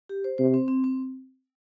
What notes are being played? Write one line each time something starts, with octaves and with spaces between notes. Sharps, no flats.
G4
C5
C3 C5
C4
C4
C4